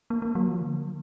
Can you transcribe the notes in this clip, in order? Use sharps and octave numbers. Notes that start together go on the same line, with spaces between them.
A#3
A#3
F#3
F3
D3